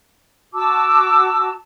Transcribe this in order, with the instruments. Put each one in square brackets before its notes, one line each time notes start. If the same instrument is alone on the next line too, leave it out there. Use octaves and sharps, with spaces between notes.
[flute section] F#4 A5 D6 E6